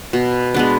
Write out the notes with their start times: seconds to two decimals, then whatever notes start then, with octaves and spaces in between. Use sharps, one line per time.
0.13 B2
0.54 G#3 B3 D4